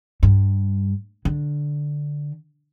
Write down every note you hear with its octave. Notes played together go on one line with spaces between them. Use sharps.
G2
D3